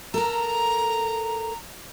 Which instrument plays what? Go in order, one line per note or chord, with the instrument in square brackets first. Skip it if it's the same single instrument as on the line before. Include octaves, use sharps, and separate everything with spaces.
[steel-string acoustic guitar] A4 A#4 [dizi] A#5